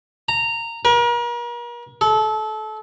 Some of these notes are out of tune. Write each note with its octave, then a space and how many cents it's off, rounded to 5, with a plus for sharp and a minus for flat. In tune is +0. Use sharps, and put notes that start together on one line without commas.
A#5 -15
A#4 +40
A4 -25